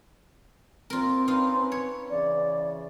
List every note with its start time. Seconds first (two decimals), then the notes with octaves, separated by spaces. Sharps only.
0.90 A#2 C4 F4 A#4
1.28 C#4 D#4 F4 B4 F5
1.72 C#5
2.10 C#3 E3 D5